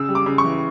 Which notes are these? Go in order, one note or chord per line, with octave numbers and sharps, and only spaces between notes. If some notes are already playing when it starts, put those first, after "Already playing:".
Already playing: C#3 E6
G3
D6
C#3
C#6
E3